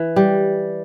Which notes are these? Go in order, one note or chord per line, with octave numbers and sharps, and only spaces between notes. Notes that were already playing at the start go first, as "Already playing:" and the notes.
Already playing: E3
G3